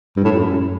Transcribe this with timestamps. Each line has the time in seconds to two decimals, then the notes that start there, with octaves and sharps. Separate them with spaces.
0.16 G2
0.24 A2
0.32 F#2